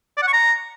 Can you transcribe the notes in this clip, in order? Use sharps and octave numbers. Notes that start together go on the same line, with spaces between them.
D5
F#5
C#6
A#5